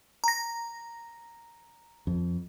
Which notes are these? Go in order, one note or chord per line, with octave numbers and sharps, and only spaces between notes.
A#5 A#6
F2